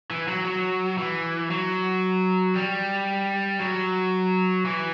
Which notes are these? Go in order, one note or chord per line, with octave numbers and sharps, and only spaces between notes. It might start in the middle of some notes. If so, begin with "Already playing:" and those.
E3
F#3
F#3
E3
F#3
G3
F#3
E3